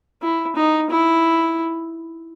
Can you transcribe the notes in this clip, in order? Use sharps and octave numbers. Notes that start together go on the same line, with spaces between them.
E4
D#4
E4